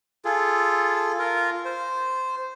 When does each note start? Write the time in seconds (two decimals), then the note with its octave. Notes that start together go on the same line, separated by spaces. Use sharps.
0.25 F4 G#4 A4
1.19 F4 A#4
1.65 C5